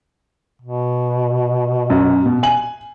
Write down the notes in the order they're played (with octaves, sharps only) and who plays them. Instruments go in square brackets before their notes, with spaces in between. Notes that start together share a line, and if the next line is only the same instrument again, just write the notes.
[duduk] B2
[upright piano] F#2
B2
G#5 F#7